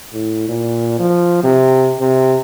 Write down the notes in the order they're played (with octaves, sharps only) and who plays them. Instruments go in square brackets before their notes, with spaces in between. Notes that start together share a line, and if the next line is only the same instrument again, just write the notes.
[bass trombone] A2
A#2
F3
C3
C3